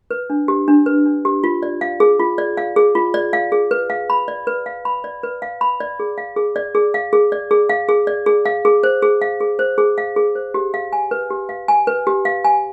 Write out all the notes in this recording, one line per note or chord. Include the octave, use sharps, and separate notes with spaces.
B4
D4
G4
D4
B4
D4
G4
F4
D5
F5
G#4
F4
D5
F5
G#4
F4
D5
F5
G#4
B4
F5
B5
D5
B4
F5
B5
D5
B4
F5
B5
D5
G#4
F5
G#4
D5
G#4
F5
G#4
D5
G#4
F5
G#4
D5
G#4
F5
G#4
C5
G#4
F5
G#4
C5
G#4
F5
G#4
C5
G4
F5
G#5
B4
G4
F5
G#5
B4
G4
F5
G#5